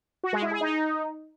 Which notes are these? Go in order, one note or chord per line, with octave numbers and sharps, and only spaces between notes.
F#4
G#3
E4
G#4
D#4